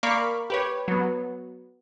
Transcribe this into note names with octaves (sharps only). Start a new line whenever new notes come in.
A#3 A#4 D5 F5 B5 C#6
G4 B4 C#5
F#3 B3